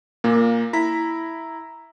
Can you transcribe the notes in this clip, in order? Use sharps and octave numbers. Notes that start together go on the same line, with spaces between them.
A#2 A#3
E4 A#5 B6